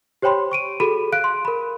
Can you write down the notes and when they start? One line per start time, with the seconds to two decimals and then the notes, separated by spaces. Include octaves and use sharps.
0.22 G4 C5 C#5 G5 B5 C6
0.52 C#6 D7 D#7
0.80 F#4 G#4 A4 B5 D#7
1.12 F5 F#6 D7
1.24 C6
1.45 A#4 B5